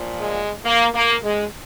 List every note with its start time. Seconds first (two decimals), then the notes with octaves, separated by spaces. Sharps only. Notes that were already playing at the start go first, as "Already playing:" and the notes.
Already playing: A#2 F3
0.21 G#3
0.66 A#3
0.95 A#3
1.24 G#3